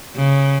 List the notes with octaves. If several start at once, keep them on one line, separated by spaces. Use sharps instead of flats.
C#3